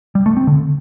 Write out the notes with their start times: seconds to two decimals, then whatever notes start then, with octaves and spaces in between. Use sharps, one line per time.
0.15 G3
0.26 A3
0.37 C4
0.47 D3